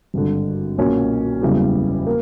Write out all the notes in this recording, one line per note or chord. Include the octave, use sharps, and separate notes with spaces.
G#1 G2 D3
B1 A#2 F#3 A#3 C#4
F#1 E2 C#3 E3 G3
A#3